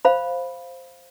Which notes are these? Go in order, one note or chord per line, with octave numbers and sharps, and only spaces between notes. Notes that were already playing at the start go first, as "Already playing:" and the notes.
C5 F5 B5